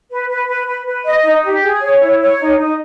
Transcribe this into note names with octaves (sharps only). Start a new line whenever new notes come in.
B4
B4
B4
B4
B4
D#5
D#4
G4
G#4
C#5
E4
C#5
D#4
D#4